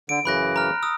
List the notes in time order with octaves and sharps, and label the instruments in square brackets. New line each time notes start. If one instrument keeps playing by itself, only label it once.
[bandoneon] D3 [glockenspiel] D7
[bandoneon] F#2 C#3 E3 [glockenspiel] B5 F#6 A#6
[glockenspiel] A#5 F6
D#6 E6